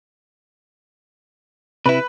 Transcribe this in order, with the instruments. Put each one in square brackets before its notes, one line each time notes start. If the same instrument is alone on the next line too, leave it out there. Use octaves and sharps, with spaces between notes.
[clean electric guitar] C3 E4 [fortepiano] B4